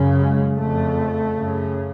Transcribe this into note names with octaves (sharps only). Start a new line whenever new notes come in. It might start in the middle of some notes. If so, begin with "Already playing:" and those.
Already playing: F#2 C#3
G#3
F2 C#3 A3
F#2 C#3